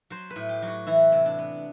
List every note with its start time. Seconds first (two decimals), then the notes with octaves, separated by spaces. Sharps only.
0.10 F#3 C5
0.30 B4
0.36 A2
0.49 G4
0.62 F#3
0.68 F#4
0.87 E3 E4
1.12 C3
1.26 D4
1.38 B3